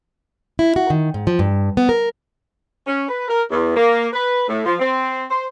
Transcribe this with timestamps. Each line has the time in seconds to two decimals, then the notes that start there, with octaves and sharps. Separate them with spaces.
0.59 E4
0.76 F#4
0.90 D#3
1.14 G#2
1.27 F3
1.39 G2
1.77 B3
1.89 A#4
2.87 C#4
3.09 B4
3.28 A#4
3.51 E2
3.76 A#3
4.13 B4
4.48 A2
4.66 F3
4.80 C4
5.31 C5